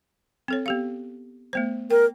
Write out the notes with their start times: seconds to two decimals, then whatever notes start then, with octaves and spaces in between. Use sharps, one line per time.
0.48 C4 A4 C#5
0.66 B3 G4 F5
1.53 A3 B3 C5
1.91 A#4 G5